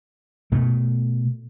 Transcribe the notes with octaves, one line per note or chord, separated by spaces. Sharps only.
B2 A3